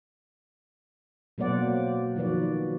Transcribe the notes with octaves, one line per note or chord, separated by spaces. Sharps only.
B2 F#3 A#3 C5 D5 F#5
D#3 F3 F#4 B4 D5